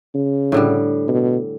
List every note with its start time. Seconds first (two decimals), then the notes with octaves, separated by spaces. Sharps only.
0.15 C#3
0.52 A2 D3 G3
1.08 B2